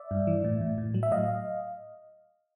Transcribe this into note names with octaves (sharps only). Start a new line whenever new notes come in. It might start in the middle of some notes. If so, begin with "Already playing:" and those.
Already playing: D5 E5
G2
E3
A2
A2
A2
F#3
E5
A2 D#5 F5